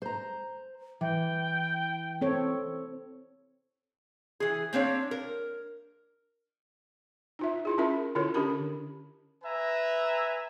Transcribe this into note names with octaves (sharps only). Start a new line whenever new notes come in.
C5 A#5
E3 G5
C4 A4 C#5
E3 G#4
A#3 C4 D4 C#5
A#4
D#4 F4 E5
E4 F4 G#4
C#4 F4 A#4 E5 B5
D3 E4 F4 A4 A#4 C#5
D3 C#4 D4 G4 A#4 B5
B4 E5 G#5 A#5